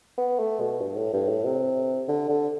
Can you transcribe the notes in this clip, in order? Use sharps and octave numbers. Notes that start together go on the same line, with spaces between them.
B3
A3
B2
G2
A2
G2
A2
C3
D3
D3